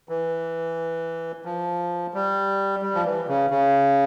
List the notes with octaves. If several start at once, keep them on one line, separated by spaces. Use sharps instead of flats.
E3
F3
G3
G3
F3
E3
C#3
C#3